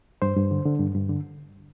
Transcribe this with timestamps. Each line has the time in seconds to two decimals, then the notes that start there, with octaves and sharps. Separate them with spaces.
0.22 G2 C5
0.37 G2
0.51 D3
0.65 D3
0.79 G2
0.95 G2
1.09 D3